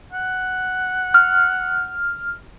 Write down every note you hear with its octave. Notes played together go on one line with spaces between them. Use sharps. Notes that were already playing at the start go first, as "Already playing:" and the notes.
F#5
F6